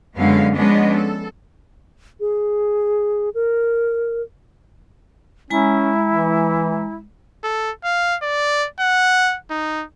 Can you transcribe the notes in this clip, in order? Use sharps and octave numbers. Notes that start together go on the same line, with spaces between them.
F#2 D3 G#3 B3 C#4 F5
F3 G#3 B3 C#4 D4 D#5
A4
G#4
A#4
G#3 C#4 E4 G#5 A#5
E3
A4
F5
D5
F#5
D#4